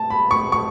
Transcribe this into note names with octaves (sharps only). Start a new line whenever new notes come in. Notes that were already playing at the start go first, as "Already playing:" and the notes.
Already playing: A5
B5
C#6
C#6